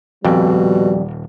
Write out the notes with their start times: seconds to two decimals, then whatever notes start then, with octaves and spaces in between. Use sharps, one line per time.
0.25 D#1 F2 B2 G3